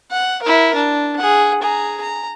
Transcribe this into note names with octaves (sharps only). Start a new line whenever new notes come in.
F#5
E4 A#4
D4
G#4 F#5
G#4 A#5
A#5